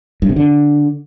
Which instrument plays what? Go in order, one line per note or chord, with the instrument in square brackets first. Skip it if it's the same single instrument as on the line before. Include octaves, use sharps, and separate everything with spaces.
[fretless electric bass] G2
C3
D3